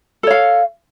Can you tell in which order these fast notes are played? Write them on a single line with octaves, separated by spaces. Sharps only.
A4 C#5 F5